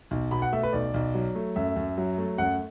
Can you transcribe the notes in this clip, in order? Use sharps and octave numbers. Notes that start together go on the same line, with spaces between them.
B1
B2 B5
F#5
A3 E5
B4
B1 D5
B1
F#3
A3
F#2 E5
F#2
F#3
A3
F#2 F#5